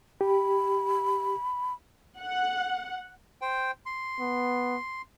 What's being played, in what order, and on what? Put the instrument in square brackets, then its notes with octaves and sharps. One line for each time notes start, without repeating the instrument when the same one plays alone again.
[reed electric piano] G4 [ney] B5
[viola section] F#5
[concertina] C5 G5
C6
[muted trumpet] B3